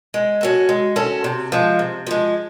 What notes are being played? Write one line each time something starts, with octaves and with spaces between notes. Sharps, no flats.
G#3
C#4 F#4 A4
G#3
C#4 F#4 A4
C3
F3 G#3
C3
F3 G#3